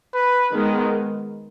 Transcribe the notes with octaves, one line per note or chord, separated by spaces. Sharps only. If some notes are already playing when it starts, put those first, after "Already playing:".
B4
D#3 G#3 B3